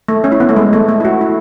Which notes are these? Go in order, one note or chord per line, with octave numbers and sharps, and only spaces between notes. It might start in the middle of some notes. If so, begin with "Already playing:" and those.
A3
C#4
E4
B3
A3
G#3
A3
A3
E4
F#4
E4